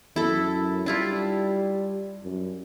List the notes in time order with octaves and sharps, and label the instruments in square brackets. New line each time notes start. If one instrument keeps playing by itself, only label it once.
[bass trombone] F#2 [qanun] E4 A4
[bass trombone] G3 [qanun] D4 E4 F4
[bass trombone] F#2